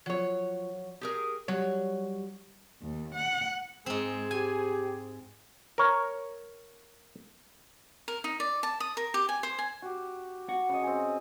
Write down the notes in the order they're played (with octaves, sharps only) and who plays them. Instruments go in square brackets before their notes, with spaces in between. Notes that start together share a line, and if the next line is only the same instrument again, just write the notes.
[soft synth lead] F3 [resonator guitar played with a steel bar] F#3 C#5
[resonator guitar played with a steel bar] G4 G#4 A#4 [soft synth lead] D#6
[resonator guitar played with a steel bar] F#3 C#5 [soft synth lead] G3
[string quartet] D#2
F#5
[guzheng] G#2 C4 [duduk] G#3 [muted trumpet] G#4
[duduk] G4 [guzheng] G#5
[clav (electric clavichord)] A#4 C#5
[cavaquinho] A#4
D#4
D5
A5
D#6
A#4
G4
G#5
C5
G#5
[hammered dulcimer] F#4 G4
[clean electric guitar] F#4
[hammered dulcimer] C#3 D#5
C4 G#4